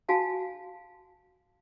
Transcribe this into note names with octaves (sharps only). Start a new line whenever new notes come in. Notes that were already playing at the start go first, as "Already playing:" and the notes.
F#4 F5 G#5 A5